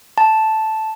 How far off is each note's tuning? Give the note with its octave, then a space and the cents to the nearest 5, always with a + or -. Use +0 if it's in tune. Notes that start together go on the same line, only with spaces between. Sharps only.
A5 -5